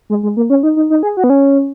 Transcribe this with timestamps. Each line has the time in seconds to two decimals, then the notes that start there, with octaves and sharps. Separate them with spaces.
0.10 G#3
0.23 G#3
0.37 A#3
0.50 C#4
0.63 D#4
0.76 D#4
0.90 D#4
1.03 G#4
1.17 F#4
1.24 B3
1.30 C#4